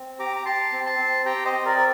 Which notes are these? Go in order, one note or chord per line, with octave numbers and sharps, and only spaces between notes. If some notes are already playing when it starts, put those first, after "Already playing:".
Already playing: C4
G4 A#5 D6
A#5
G4 A5 C6
C4
A5 C6
C4
G4 G5 A#5
C5 D#5
C4
A#4 D5
A#4